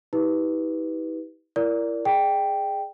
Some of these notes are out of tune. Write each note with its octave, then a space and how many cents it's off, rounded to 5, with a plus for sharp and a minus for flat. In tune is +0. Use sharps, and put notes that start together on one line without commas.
E4 -45 G4 +0 B4 +0
E4 +30 A#4 +0 D5 -20
G#4 +0 D5 +40 G5 +0